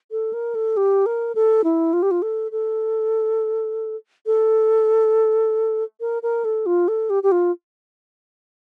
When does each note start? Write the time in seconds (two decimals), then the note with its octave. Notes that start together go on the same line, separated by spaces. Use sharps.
0.11 A4
0.33 A#4
0.55 A4
0.77 G4
1.06 A#4
1.35 A4
1.64 E4
1.93 F4
2.02 G4
2.11 F4
2.22 A4
2.52 A4
4.26 A4
6.01 A#4
6.23 A#4
6.44 A4
6.66 F4
6.88 A4
7.10 G4
7.23 G4
7.32 F4